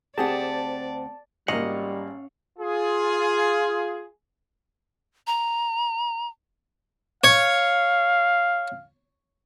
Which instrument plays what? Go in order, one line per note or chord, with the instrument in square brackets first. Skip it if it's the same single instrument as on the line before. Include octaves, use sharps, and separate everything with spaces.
[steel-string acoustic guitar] D2 C4 F#5 [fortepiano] G4 G#4 [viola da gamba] D5 [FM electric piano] A5
[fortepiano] G#1 A#3 [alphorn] G3 [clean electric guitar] C#4 F5 F#5 [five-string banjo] D#5
[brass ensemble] F4 G#4
[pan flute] A#5
[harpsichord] C#5 [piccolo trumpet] F5